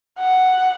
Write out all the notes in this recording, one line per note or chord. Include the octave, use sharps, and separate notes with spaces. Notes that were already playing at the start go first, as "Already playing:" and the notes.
F#5